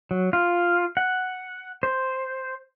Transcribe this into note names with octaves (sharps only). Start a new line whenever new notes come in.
F#3
F4
F#5
C5